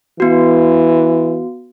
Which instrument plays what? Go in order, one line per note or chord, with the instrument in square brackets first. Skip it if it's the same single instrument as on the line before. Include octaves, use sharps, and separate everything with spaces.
[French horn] E3 [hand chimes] B3 F#4